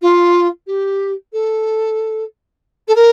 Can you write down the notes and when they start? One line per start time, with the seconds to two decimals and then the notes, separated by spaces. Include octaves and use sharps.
0.02 F4
0.67 G4
1.32 A4
2.88 A4
2.95 A#4